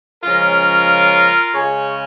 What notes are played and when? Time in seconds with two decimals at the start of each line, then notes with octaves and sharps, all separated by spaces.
0.23 C#3 F3 G#3 C#4 F4 A#4
1.54 C#3 G#3 C#4 G#4 C#5